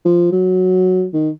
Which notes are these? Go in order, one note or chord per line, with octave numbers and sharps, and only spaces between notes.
F3
F#3
D#3